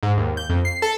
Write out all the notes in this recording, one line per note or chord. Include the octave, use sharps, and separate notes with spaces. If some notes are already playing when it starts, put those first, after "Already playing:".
G#2
D#2
G6
F2
C7
A4